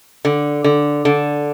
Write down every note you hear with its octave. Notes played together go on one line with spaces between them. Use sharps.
D3
D3
D3